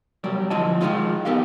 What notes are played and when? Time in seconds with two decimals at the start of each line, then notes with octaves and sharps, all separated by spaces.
0.24 C2 F#3 G3 D5
0.50 D2 F3 E4 C5 D#5 A5
0.81 D#3 F3 F#3 G#3 D#4 F4
1.25 B3 D#4 G4 A#4 F5